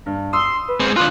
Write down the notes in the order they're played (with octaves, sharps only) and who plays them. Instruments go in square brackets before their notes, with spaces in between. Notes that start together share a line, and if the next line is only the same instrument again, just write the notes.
[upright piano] G2
[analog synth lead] C6 [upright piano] D#6 E6
[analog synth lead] B4
[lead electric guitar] G#3 C4
[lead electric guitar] D3 F4 [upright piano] C6 [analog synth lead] F#6